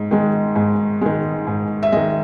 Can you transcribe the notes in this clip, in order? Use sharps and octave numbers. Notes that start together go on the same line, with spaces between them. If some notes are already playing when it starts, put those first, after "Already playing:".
Already playing: G#2
D#3 G#3
G#2
D#3 G#3
G#2
E5
D#3 G#3 D#5